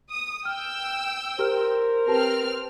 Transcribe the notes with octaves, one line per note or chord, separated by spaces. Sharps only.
D#6
G5 E6 F6
G4 A#4 C5 F6
C4 G4 B4 A5 F6